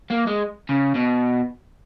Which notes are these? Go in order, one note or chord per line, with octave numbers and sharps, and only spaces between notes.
A#3
G#3
C#3
B2